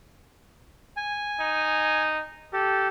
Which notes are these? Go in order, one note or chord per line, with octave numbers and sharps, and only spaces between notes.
G#5
D#4
G4 A4